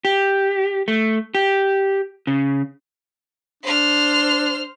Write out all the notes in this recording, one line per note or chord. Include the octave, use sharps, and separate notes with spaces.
G4
A3
G4
C#3
D4 C5 F6